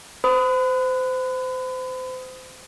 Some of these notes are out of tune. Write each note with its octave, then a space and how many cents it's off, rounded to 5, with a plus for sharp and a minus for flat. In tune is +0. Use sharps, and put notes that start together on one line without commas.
C5 -30 B5 +40 D#6 +10